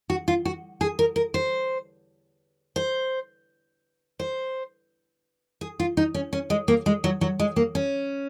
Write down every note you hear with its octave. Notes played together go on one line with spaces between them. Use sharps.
F#4
F4
F#4
G#4
A#4
A#4
C5
C5
C5
G#4
F4
D#4
C#4
C#4
G#3
A#3
G#3
F#3
F#3
G#3
A#3
C#4